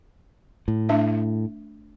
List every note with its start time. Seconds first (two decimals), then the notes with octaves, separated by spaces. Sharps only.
0.68 A2
0.89 A3 D4 E5